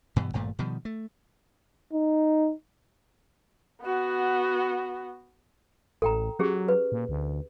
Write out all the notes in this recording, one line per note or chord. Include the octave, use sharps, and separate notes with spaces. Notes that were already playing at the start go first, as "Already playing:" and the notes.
G2 B2 E3 G3
G#1 G2 A#2 A3
B2 D#3 F3 G3
A3
D#4
B3 F#4
A1 A4 G5 A#5
F#3 C#4 G4 G#4
B4
A#2
D2